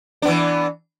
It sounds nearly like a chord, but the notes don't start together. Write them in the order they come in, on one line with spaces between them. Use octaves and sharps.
D4 B3 E3